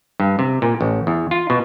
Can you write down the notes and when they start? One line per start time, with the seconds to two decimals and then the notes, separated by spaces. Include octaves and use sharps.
0.20 G2
0.39 C3
0.62 A#2
0.81 A1
1.07 E2
1.31 F4
1.50 B2